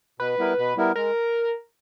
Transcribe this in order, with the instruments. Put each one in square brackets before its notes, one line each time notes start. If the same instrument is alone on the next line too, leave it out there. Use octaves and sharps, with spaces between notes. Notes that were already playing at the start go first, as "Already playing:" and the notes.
[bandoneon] B2 [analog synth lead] B4
[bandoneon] G3 B3 E4 A#4
B2
G3 B3 E4 A#4
[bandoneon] G#3 [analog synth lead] A#4